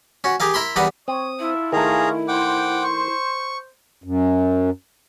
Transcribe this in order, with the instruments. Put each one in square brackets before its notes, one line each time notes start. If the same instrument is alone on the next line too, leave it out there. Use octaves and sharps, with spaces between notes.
[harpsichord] C#4 F#4
G4 G#4 A#4 F5
E4 A#4 B5 C6
E2 G3 A#4 B4 F#5 D#6
[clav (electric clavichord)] C4 [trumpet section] C#5 [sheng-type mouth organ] D#6
[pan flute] E4 [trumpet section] F4 A4 E5
[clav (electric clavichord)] D#3 A3 [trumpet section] C#4 F4 F5 [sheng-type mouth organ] G#4 A#5
[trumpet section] C5 [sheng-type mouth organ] F#5 G5 D6
[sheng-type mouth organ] C#6
[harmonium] F#2